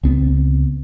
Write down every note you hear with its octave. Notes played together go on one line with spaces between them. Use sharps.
C#2 B3 C4